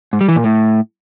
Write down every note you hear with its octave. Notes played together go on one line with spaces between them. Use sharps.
G#2
G3
E3
A#2
A2